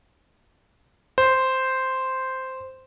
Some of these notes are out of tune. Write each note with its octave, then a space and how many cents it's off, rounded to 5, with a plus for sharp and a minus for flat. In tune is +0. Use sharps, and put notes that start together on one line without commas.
C5 -5